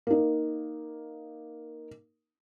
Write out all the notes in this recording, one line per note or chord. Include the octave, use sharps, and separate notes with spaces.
A#3 D#4